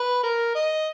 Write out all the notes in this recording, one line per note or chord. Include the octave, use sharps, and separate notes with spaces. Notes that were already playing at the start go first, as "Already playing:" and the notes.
Already playing: B4
A#4
D#5